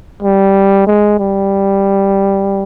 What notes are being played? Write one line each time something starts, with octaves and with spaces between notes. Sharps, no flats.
G3
G#3
G3